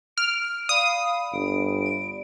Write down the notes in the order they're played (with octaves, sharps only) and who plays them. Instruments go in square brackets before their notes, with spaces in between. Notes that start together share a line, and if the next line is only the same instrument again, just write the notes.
[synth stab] F6 [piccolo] D7
[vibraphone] D5 B5 [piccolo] F5 [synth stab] D#6
[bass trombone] G1 [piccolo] D7
[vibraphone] D5